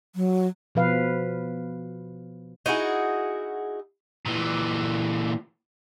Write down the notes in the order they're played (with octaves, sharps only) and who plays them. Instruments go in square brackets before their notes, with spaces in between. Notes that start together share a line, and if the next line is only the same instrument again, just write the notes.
[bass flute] F#3
[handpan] B2 F3 B4 F5
[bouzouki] D#4 E4 F#4 G#4
[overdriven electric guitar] A#2 E3